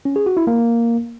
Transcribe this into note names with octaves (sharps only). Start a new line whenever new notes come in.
C#4
G#4
F#4
E4
A#3